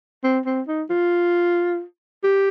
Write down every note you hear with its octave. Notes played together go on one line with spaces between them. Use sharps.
C4
C4
D#4
F4
G4